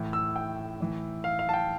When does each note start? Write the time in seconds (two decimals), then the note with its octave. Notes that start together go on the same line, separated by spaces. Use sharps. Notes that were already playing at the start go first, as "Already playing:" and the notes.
Already playing: A2 E3
0.13 E6
0.36 G5
0.80 A2 E3
1.24 F5
1.39 F5
1.49 A5
1.54 G5